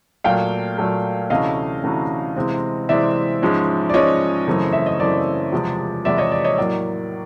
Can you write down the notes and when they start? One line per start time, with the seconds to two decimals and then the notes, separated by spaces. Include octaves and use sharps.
0.24 A#2 F#3 A3 F5 G5
0.78 A#2 F#3 A3
1.30 D2 C3 E3 A3 C#4 D#5 F5
1.83 D2 C3 E3 A3 C#4
2.36 C3 E3 G#3 C4
2.89 C3 E3 G#3 C4 D5 E5
3.42 G#2 F3 G#3 C#4
3.90 D5
3.94 G#2 F3 G#3 C#4 C#5 D#5
4.47 F#2 C#3 E3 A3 C4
4.73 E5
4.86 D#5
4.99 F#2 C#3 E3 A3 C4 D5
5.52 E2 C3 F3 G#3
6.05 E2 C3 F3 G#3 D5 E5
6.18 C#5 D#5
6.32 D5
6.44 C#5 D#5
6.58 A2 F#3 A#3 D5